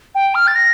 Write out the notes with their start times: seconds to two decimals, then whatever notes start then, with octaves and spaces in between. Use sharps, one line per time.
0.14 G5
0.34 F6
0.47 A6
0.55 A#6